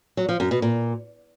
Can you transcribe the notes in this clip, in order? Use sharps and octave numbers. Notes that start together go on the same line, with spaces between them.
F#3
F3
F#2
B2
A#2